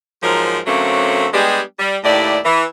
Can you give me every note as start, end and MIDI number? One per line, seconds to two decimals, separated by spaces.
0.23 0.60 44
0.23 0.60 53
0.23 0.60 54
0.23 0.60 70
0.67 1.27 50
0.67 1.27 54
0.67 1.27 57
0.67 1.27 58
0.67 1.27 60
0.67 1.27 61
1.34 1.61 55
1.34 1.61 56
1.34 1.61 59
1.34 1.61 62
1.34 1.61 67
1.34 1.61 68
1.79 1.97 55
2.04 2.38 39
2.04 2.38 45
2.04 2.38 64
2.04 2.38 67
2.04 2.38 74
2.45 2.64 52